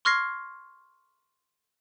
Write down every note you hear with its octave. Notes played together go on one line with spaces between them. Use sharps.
C6 C#6 F6 G#6 A#6 C7